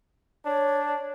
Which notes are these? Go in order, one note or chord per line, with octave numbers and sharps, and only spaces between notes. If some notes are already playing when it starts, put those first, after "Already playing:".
D4 C#5